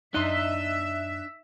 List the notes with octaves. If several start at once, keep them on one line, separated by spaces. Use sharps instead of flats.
F#2 D4 D#4 D#5 E5 C6 F#6